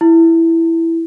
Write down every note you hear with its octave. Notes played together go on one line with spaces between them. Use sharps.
E4